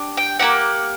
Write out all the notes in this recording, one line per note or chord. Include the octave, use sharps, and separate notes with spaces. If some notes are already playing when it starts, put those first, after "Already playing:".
Already playing: D4 G4
G5
A#3 D4 G4 F#5